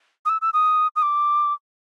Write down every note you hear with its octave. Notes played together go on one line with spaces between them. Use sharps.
D#6
E6
E6
D#6
D#6
D6